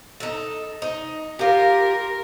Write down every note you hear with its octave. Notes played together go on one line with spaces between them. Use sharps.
D#4 A4
D#4
F4 G4 A#4